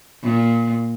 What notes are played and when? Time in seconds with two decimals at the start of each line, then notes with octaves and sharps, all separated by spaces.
0.23 A#2